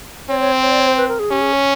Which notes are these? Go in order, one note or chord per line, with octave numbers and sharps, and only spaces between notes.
C4 C#5
C#5
C5
C#5
D5
C#5
C5
B4
A#4
G#4
C#4 G4
G#4
C#5